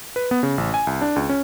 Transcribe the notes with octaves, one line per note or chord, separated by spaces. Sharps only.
B4
B3
C#3
A1
G#5
C2
D4
C#2
C#4